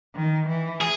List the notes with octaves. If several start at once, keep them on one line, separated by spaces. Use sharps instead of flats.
D#3
E3
G#4